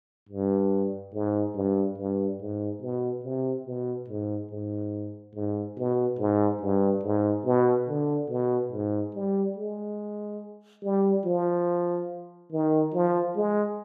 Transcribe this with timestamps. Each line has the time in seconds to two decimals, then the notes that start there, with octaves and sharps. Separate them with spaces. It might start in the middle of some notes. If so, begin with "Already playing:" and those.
0.29 G2
1.14 G#2
1.55 G2
1.98 G2
2.41 G#2
2.82 B2
3.24 C3
3.66 B2
4.08 G#2
4.51 G#2
5.35 G#2
5.77 B2
6.19 G#2
6.61 G2
7.04 G#2
7.45 B2
7.89 D3
8.30 B2
8.72 G#2
9.15 G3
9.56 G#3
10.83 G3
11.25 F3
12.52 D#3
12.94 F3
13.36 G#3